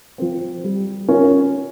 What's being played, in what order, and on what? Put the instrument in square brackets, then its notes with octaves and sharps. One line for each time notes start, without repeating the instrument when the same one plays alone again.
[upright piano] F3 C4
G3
C#4 F4 A#4 C#5